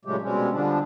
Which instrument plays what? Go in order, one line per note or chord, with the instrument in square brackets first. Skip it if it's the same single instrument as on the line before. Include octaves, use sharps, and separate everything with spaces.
[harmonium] A#2 C#3 F#3 G#3 A3 G4
B2 G3 G#3 C4 C#4
D3 F3 G3 D4